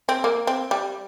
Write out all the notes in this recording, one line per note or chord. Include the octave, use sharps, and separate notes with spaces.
C4
A#3
C4
G3